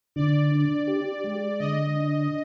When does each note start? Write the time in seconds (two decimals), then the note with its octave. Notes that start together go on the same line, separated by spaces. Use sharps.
0.16 D3 D5
0.51 D4
0.87 G4
1.24 G#3
1.59 D3 D#5
1.96 D4